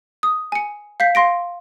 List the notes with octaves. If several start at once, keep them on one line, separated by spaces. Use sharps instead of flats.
D#6
G#5 C#7
F5 G6 B6
F5 C6 A#6 D7